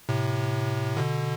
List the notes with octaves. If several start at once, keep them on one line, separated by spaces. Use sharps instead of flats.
A2 C3
B2 D3